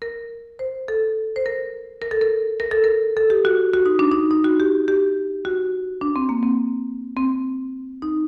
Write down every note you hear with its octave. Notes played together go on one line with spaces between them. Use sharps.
A#4
C5
A4
C5
A#4
A#4
A4
A#4
A#4
A4
A#4
A4
G4
F#4
F#4
D#4
D4
D#4
D#4
F#4
G4
G4
F#4
D4
C4
A#3
C4
C4
D#4